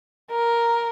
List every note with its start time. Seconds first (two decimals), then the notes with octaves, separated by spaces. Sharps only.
0.32 A#4